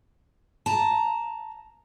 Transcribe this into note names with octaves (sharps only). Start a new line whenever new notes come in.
A5 A#5